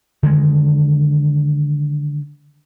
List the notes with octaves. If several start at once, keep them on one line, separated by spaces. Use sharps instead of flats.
D3 D#3 G#3